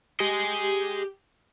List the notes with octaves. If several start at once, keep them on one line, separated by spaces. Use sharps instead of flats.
G4 G#4 D#5